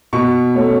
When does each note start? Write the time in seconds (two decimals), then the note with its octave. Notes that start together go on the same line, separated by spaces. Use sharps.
0.13 B2 C#6
0.54 A3 C#4